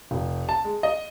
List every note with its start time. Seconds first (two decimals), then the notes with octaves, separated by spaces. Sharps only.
0.11 F1
0.49 A5
0.65 G#3
0.83 D#5